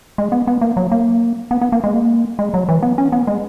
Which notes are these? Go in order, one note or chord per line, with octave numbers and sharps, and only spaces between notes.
G#3
B3
B3
A#3
F#3
A#3
B3
B3
A#3
G#3
A#3
G#3
F#3
E3
B3
C#4
B3
G#3